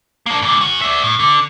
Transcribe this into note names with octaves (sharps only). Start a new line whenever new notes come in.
A#3 D4
G#2 D3
C#4 F#4
D5 E5
A2
D3